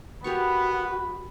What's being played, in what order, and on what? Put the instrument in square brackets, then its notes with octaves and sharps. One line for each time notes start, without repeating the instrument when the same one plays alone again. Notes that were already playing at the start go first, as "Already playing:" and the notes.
[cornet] B3 [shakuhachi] F#4 [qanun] G4 A#4 C#6 [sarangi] B5